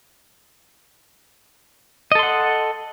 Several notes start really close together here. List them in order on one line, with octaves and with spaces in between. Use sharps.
D#5 A4 C6 F#5